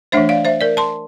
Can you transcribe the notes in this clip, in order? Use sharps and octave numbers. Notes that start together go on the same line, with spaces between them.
E3 A3 D4 C5 E5
D5 F5
C5 E5
A#4 D5
A5 C6